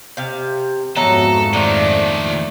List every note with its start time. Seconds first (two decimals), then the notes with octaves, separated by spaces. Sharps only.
0.17 C3 F5
0.96 F2 G#2 F3 F#3 B3 A4 E5 A#5
1.53 A#2 D#3 A3 D4